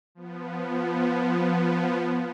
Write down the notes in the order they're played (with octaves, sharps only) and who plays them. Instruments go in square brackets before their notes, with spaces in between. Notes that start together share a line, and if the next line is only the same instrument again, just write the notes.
[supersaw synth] F3 B3